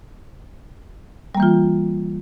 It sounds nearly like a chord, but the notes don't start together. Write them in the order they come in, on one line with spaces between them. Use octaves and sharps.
G3 A#3 E3 F4